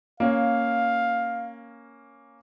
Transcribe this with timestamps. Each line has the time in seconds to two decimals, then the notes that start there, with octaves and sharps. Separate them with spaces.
0.20 A#3 C#4 F5